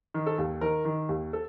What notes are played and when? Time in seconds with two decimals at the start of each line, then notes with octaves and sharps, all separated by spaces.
0.14 D#3
0.27 A4
0.38 D#2
0.61 D#3 A#4
0.85 D#3
1.09 D#2
1.33 A4